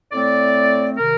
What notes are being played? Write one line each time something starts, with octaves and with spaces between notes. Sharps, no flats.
A2 A3 C4 D5
C3 D#3 A#4